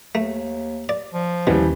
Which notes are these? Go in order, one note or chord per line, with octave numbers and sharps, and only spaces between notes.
D#2 A3
D5
F3
D#2 B2 E3 G3 C#4